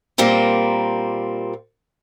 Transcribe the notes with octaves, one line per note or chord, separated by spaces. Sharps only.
A#2 G3 A#3 C4